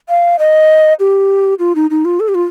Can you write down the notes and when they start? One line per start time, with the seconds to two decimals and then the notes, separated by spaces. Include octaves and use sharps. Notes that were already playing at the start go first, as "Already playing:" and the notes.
0.09 F5
0.39 D#5
1.00 G4
1.59 F4
1.75 D#4
1.90 D#4
2.05 F4
2.20 A4
2.28 G4
2.35 F4